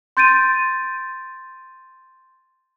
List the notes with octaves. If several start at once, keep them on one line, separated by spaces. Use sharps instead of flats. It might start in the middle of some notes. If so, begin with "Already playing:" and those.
C6 G6 A6 D7 D#7